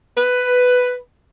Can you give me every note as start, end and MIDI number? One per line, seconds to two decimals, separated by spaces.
0.17 0.98 71